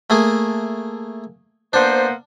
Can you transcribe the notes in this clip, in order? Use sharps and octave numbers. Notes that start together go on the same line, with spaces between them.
A3 A#3 G#4
A#3 B3 D4 C5